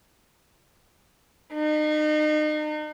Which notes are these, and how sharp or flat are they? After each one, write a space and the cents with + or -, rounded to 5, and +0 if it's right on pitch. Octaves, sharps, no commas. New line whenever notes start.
D#4 -35